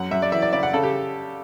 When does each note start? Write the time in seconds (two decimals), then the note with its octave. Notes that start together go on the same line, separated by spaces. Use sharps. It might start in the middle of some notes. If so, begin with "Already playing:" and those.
Already playing: F#2 F#5
0.11 F#2 E5
0.22 D5
0.32 E3 E5
0.42 D5
0.53 C#3 D5
0.63 F#5
0.73 C#3 A4
0.83 G4